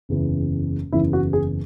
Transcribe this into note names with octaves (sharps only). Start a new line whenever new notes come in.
F#1 E2 C#3 E3
F#1 E2 C#3 E3 E4
F#4
G#4